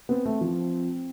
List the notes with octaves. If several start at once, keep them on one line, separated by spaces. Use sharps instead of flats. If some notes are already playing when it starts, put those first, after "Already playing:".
B3 C4
A3
F3